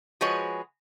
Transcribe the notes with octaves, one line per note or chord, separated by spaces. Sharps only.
F3 G#3 F#4 G#4 B4 C#5